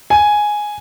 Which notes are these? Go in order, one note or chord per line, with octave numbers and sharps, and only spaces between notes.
G#5